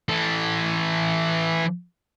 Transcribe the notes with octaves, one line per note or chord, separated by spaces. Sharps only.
E3 A4